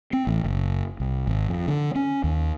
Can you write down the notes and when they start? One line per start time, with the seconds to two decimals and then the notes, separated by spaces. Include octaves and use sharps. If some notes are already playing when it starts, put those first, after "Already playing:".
0.13 C4
0.27 A1
0.44 F#1
1.00 C2
1.27 G#1
1.49 F2
1.68 D3
1.96 C#4
2.24 D#2